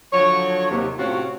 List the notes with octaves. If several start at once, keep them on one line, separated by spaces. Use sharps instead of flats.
D3 F3 F#3 C#5
D#2 C3
A2 C3 C4 C#4 F4 F#4